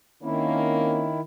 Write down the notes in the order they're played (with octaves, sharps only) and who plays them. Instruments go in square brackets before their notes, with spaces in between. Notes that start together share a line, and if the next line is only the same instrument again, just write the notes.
[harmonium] D#3 E4 [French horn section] A#3 C4 C#4